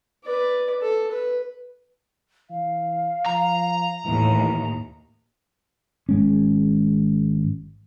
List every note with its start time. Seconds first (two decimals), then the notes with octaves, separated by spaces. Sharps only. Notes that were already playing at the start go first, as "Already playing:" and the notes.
0.25 B4 D5
0.82 A4
1.11 B4
2.50 E3 F5
3.26 F3 A#5
4.06 D#2 A2 E3
6.09 G#1 G#3 C#4